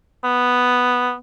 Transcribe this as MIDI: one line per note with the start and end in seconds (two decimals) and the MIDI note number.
0.24 1.15 59